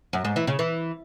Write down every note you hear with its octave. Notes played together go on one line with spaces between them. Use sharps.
F#2
G#2
E3
C#3
E3